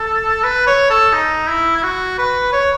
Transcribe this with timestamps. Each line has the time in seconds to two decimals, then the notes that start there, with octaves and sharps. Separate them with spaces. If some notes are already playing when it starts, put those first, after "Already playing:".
Already playing: A4
0.44 B4
0.67 C#5
0.90 A4
1.13 D#4
1.48 E4
1.76 E4
1.83 F#4
2.18 B4
2.53 C#5